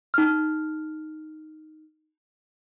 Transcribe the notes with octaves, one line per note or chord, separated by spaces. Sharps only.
D#4 F6